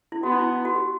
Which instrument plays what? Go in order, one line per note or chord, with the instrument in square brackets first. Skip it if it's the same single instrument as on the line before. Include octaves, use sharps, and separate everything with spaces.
[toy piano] E4
[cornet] B3 [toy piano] F#4
[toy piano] D#4
E4
D#4
F#4
G4